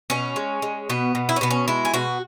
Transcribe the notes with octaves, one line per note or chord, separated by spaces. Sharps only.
B2 C#4
G#3
G#3
B2 B3
B2
E4
C#4
B2 B3
C#4
G#3 E4
G#4
B2 F#4